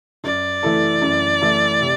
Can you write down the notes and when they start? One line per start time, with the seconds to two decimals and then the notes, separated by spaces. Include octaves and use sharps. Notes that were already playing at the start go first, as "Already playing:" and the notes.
0.24 F#2 D5
0.63 E3 A3 E4 A4
1.01 F#2
1.41 E3 A3 E4 A4
1.81 C3